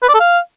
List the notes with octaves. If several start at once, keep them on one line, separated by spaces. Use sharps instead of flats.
B4
D5
A4
F5